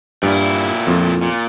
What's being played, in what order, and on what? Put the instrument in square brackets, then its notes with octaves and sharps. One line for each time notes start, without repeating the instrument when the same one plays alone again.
[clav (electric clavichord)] G2 [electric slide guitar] A#2 E4
[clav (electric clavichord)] F2
[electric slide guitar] A#2